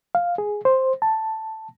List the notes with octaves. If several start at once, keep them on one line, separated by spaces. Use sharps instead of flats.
F5
G#4
C5
A5